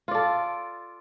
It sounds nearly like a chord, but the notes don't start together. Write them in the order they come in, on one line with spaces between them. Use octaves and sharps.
F4 D5 A4